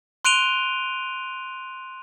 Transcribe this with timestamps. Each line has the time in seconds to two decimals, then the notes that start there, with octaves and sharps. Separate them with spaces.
0.25 C6 F#6 D7 D#7 F7 G7